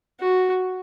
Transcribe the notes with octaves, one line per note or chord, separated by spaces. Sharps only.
F#4